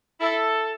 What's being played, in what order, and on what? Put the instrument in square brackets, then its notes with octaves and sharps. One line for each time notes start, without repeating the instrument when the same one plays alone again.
[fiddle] E4 [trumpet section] A4